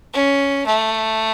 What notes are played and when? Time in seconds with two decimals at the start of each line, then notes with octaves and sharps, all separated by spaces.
0.13 C#4
0.66 A3